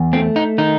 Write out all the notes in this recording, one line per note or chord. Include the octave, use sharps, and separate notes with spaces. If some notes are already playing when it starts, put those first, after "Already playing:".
Already playing: E2
A3 C4
D#4
D#3 D#4